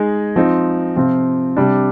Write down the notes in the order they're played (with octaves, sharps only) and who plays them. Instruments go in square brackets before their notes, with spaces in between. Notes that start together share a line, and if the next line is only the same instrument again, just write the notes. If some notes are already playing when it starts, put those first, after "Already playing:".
Already playing: [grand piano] G#3 D#4 G#4
F3 C4 D#4
C3 F3 C4 F4
C3 G3 D4